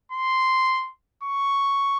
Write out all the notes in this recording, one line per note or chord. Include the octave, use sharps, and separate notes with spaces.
C6
C#6